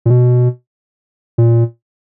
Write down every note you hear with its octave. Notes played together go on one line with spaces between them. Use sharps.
A#2
B2
A#2